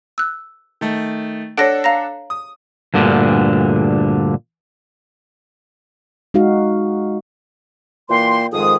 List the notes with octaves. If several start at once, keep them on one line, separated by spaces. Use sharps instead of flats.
E6 F#6
D#3 A3
D4 A4 C#5 F#5 A#6 D7
F5 A#5 A#6
D#6
D2 G2 A#2 D3
G#3 D#4 F#4 F5
A#2 E3 A#3 G5 C6
F2 G#2 D#3 G#3 D#6